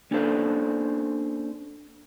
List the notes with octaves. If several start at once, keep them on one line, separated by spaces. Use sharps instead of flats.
A#3 C#4 D4 A4 C5 F5